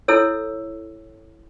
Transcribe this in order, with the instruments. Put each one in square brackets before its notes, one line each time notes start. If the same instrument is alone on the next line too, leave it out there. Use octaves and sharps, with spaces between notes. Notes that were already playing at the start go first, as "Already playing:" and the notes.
[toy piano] E4 A4 C#5 E6